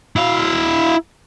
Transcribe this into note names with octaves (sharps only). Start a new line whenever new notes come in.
E4 F5